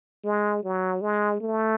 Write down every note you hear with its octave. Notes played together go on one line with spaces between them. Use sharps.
G#3
F#3
G#3
A3